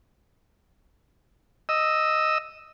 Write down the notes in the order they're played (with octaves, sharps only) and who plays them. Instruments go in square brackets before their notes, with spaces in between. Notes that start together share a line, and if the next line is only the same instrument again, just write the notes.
[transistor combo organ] D#5 E6